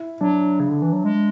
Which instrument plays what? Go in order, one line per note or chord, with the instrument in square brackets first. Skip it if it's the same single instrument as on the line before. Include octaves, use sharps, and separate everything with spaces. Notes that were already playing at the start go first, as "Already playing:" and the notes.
Already playing: [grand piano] E4
[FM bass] F#3 [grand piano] D4
[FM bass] C#3
D3
E3
F#3
G#3